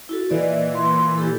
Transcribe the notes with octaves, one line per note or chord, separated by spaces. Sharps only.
E4 F#4 A4
A#2 E3 D5 D#5
C6
E4 G4 A4